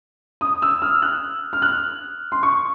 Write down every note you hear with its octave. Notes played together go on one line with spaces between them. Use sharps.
D#6
E6
F6
F#6
F6
F#6
C6
C#6